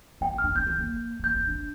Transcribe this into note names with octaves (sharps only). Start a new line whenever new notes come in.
C4 G5
C4
F6
D4
C4 G6
C4
A#3
C4
A#3 G6
C4
D4